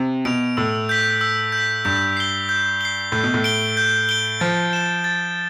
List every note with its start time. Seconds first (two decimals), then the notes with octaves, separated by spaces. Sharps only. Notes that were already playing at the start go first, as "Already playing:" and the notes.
Already playing: C3
0.25 B2 D7 F7
0.57 A2 E6
0.89 G6 B6
1.21 E6
1.52 G6
1.58 B6
1.85 G2 G6
2.17 C7 G7
2.49 G6
2.81 C7 G7
3.12 A2 G6
3.24 B2
3.34 A2
3.44 D7 G7
3.77 G6
4.09 D7 G7
4.40 F3 A6
4.73 E7 G7
5.04 A6